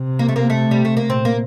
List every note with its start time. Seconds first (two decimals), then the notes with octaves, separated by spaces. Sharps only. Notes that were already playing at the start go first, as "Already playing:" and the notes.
Already playing: C3
0.19 A#3
0.28 A3
0.36 A#3
0.50 A3
0.71 G3
0.85 A3
0.97 A#3
1.10 A#2 C4
1.25 A#3